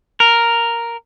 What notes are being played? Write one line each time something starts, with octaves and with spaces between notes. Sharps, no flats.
A#4